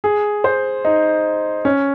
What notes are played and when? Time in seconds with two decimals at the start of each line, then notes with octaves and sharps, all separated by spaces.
0.04 G#4
0.44 C5
0.85 D#4
1.65 C#4